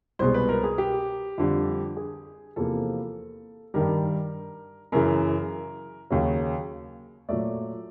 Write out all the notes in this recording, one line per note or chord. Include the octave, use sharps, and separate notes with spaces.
C2 B2 G#3 C5
B4
A#4
G#4
G4
F2 D3 G3
G#4
E2 C3 F3 A#3 A4
G2 D#3 G3 A#4
F#2 C#3 E3 A#4
D#2 C#3 F#3
A#2 F#3 A3 D5